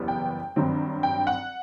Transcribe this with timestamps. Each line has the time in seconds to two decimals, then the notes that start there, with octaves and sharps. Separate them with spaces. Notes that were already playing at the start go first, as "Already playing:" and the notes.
Already playing: F#1 E2 G3 B3
0.08 G5
0.56 G2 D#3 F#3 C4
1.03 G5
1.27 F#5